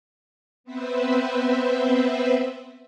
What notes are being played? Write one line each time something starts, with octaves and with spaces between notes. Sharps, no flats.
B3 C4 B4 C5 E5